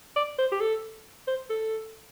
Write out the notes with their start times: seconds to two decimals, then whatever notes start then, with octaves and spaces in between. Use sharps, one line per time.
0.16 D5
0.39 C5
0.52 G4
0.60 A4
1.28 C5
1.50 A4